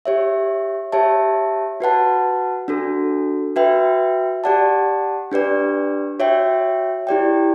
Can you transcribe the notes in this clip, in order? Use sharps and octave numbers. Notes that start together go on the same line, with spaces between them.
G4 C#5 E5
G4 C#5 E5 A5
F#4 B4 F#5 A5
D4 F#4 A4
F#4 B4 E5 G5
G4 D5 F#5 A5
D4 G4 B4 D5
F#4 C#5 E5 G5
E4 G4 D5 G5